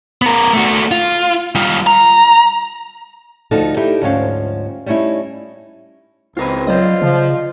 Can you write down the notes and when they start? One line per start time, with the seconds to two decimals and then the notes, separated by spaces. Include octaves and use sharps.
0.22 B3 A#4
0.53 A3 F#4
0.91 F4
1.55 G3 F4
1.87 A#5
3.51 D2 F3 D#4 F#4 A4 A5
3.77 D#4 E4 G4
4.02 D2 G#2 F3 C4 C#4 F5
4.86 G3 A3 C#4 D#4 E4
6.37 C#2 C4 F4 A#4 B4
6.67 F#3 F4 C5 D5 D#5
7.02 C#3 F3